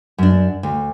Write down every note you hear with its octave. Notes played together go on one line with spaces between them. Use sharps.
F#2 D4
D2